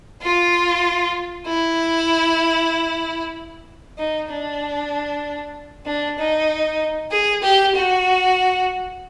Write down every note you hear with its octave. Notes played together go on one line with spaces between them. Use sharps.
F4
E4
D#4
D4
D4
D#4
G#4
G4
F#4